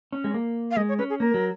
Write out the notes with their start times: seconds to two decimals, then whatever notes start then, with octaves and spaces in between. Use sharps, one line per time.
0.12 C#4
0.24 G#3
0.34 A#3
0.71 F5
0.77 G#3 D#5
0.89 C#5
0.98 C#4 B4
1.10 G#4
1.20 A#3 A#4
1.34 F#3